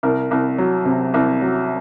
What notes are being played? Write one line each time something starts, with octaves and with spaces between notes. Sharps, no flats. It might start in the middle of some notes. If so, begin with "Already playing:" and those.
C2 A#4
C2
F#3
C3
C2
F#3